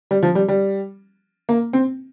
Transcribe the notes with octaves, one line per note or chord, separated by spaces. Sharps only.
G3
F3
G3
G3
A#3
C4